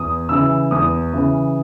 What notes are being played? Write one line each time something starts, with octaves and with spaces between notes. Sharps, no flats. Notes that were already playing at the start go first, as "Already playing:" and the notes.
Already playing: E2 D#6
C#3 E3 E6
E2 D#6
C#3 E3